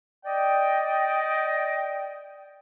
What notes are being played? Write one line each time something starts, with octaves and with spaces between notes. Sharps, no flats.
D5 D#5 G5